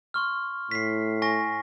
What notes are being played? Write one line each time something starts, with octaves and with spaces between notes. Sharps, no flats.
C6 C#6 F6
A2 B6 C7
G#5 C#6 A#6